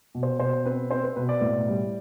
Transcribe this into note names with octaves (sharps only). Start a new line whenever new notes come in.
B2
C5
B2 C5
C4 B4
C4 C5
B4
B2 B4
D5
A2
G3